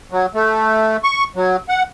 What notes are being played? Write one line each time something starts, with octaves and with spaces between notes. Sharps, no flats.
F#3
A3
C#6
F#3
F#5